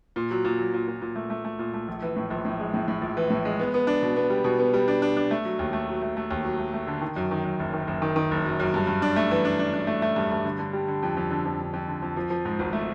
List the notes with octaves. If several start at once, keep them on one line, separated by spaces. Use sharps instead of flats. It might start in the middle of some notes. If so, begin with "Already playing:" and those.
A#2
F#3
A#2
F#3
A#2
A#2
A#2
A3
A3
A3
A#2
A3
A#1
E3
A2
A#1
A2
G#3
A2
A2
A#1
E3
A2
G#3
B3
B3
D4
B2
B3
G3
B2
B3
G3
D4
D4
D4
A3
F#3
D#2
A3
F#3
A3
A3
D#2
F#3
A3
A3
D3
D#3
F#2
D#3
F#2
F#1
D#3
F#1
D#3
D#3
F#1
F#2
F#2
G2
G2
D4
A3
E3
D4
D4
D4
A3
A3
G2
G2
D3
D3
G3
D3
F2
F2
D3
F2
D3
F2
D3
F2
F3
F3
G#2
G#1
A3